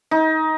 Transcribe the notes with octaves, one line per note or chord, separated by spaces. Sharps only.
D#4